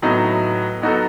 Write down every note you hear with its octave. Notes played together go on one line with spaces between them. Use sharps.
A2 F#3 B3 D#4
F#3 B3 D#4 F#4 A4